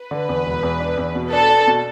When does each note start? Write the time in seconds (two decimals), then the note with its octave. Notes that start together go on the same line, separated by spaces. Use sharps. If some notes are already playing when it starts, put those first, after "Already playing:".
Already playing: B4
0.11 D3
0.29 E2
0.46 E1
0.63 E2
0.80 D4
0.97 E2
1.15 B2
1.33 D4 A4
1.50 D4
1.67 B2